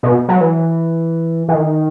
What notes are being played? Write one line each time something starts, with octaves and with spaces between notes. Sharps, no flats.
B2
F#3
E3
E3
D#3